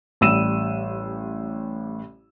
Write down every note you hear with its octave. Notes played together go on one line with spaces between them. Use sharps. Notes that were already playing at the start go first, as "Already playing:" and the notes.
A1 G3 E6 D#7 E7